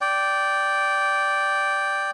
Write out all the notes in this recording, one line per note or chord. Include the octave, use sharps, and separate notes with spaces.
D5 G5